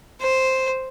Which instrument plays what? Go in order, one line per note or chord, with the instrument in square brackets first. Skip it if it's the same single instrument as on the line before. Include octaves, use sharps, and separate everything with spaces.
[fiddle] C5